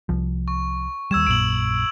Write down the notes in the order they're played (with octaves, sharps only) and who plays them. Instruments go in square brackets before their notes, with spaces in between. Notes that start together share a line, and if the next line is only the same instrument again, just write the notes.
[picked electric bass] C2 F3
[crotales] C#6
[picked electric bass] D#2 G3 [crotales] E6 G#6 E7
[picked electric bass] A#1 F#2 A#2 [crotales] D7 F#7